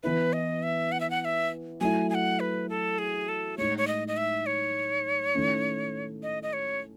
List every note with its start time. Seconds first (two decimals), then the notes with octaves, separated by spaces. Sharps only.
0.03 E3 B3 E4 B4
0.33 D#5
0.63 E5
0.92 F#5
1.00 E5
1.10 F#5
1.21 F#5
1.25 E5
1.81 F#3 A3 E4 G#5
2.10 G#5
2.15 F#5
2.40 B4
2.69 A4
2.98 G#4
3.29 A4
3.58 A2 G#3 D#4 C#5
3.78 C#5
3.87 D#5
4.08 D#5
4.17 E5
4.46 C#5
5.34 D#3 A3 C#4 E4
6.23 D#5
6.43 D#5
6.53 C#5